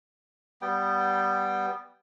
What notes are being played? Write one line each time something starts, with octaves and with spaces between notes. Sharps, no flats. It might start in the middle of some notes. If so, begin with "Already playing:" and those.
G3 B3 G5